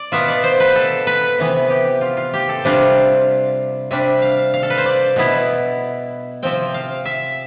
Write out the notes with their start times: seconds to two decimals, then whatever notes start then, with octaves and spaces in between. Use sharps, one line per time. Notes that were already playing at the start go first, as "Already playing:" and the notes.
Already playing: D5
0.12 B2 B3 F4 E5
0.28 D5
0.44 C5
0.60 B4
0.75 A4
1.07 B4
1.38 C3 E3 B3
1.70 G4
2.01 F4
2.17 F4
2.33 G4
2.49 A4
2.65 C3 G3 D4 F4
3.91 C3 G3 D4 E5
4.22 F5
4.54 F5
4.63 A4
4.70 B4
4.77 C5
4.85 D5
5.16 B2 B3 E4
6.43 C3 F3 C4 G5
6.74 F5
7.05 E5